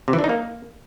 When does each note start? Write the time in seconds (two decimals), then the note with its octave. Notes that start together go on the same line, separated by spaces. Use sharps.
0.08 C3
0.13 E3
0.19 D4
0.24 D#4
0.29 A#3